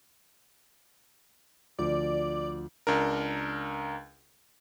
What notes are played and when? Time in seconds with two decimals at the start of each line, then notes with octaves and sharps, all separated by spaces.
1.79 D2 F3 D5
2.87 C#2 D4 A#4